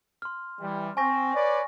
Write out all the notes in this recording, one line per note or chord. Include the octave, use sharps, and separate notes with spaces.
C6 F6
E3 G3
C4 G#5 C#6 A#6
B4 C#5 D5